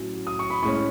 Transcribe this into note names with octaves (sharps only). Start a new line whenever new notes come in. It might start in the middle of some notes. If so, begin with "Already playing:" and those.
Already playing: A2 F#3 C#4
D#6
C#6
B5
A2 G#3 C#4 C#6